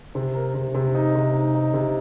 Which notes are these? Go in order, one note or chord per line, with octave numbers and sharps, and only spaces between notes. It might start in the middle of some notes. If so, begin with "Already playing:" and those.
C3
A#4
C3
C3
D#4
C3
D#4
D#4
C3